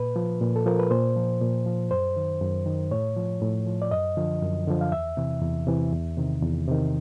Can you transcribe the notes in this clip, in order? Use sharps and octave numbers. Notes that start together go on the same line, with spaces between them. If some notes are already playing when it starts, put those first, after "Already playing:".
Already playing: A#2 B4
F3
A#2
A4
F3 A#4
B4
A#2 C5
F3
A#2
F3
F#2 C5
D#3
F#2
D#3
A2 C#5
F3
A2
F3
D5
F#2 D#5
D3 F3
F#2
D3 F3
F5
E2 E5
C3 E3
E2
C3 E3
E2
C3 D#3
E2
C3 D#3